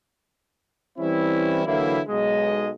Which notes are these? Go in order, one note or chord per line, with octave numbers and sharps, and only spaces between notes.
E3 G3 C4 C#4 E4
D3 E3 F#3 A#3 E4
B1 G#3 D#5